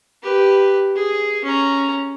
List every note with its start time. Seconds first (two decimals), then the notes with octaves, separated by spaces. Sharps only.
0.23 G4 B4
0.95 G#4
1.45 C#4 A#5